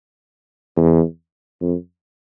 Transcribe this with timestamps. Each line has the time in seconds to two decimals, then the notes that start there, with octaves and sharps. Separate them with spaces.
0.77 E2
1.62 F2